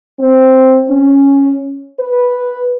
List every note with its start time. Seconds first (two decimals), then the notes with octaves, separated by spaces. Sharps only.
0.20 C4
0.89 C#4
2.00 B4